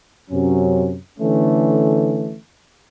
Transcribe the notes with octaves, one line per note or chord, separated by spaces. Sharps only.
F#2 C3 F#3 C#4
D3 E3 A3 C#4